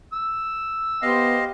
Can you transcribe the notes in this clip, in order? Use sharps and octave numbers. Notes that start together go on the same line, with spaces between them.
E6
B3 G4 C5 D#5 F5